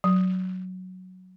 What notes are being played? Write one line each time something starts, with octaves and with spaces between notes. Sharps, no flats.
F#3